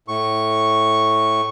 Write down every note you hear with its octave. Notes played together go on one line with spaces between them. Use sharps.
A2 C#6